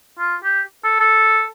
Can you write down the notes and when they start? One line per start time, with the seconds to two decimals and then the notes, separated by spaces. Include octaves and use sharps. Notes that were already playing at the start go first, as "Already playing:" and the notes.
0.19 F4
0.44 G4
0.84 A4
1.00 A4